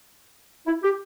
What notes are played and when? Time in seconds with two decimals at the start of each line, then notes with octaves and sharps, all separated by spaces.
0.66 E4
0.83 G4